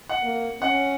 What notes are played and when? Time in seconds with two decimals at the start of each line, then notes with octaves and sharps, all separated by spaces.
0.09 F#5
0.22 A#3
0.62 C#4 F#5